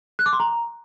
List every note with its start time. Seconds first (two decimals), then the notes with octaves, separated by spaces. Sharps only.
0.19 F#6
0.26 D6
0.33 C6
0.40 A#5